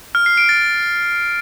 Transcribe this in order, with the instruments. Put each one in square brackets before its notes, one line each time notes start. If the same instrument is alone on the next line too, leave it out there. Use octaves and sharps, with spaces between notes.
[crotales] F6
C7
D7
A6